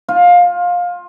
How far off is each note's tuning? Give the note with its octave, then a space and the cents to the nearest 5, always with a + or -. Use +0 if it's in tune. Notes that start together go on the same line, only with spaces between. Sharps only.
F4 +20